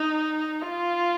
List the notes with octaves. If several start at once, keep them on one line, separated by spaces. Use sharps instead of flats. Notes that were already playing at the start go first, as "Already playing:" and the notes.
Already playing: D#4
F4